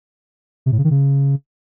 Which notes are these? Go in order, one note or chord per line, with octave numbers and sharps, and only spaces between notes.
C3
A2
C#3
D#3
C#3